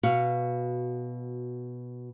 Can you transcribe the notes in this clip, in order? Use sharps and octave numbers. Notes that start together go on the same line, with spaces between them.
B2 F#4 F5